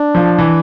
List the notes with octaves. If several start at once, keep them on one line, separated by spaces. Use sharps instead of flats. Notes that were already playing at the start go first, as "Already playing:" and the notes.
Already playing: D4
F3
E3